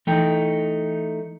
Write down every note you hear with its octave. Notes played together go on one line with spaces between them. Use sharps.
E3 A3 D#4 G5